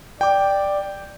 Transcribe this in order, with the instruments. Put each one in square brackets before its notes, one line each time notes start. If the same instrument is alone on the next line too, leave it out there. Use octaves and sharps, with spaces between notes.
[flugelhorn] D5 [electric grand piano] G5 D6